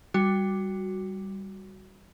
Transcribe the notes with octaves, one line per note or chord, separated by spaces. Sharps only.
G3 F#4